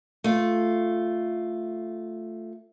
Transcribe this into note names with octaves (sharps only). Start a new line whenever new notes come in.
A3 F4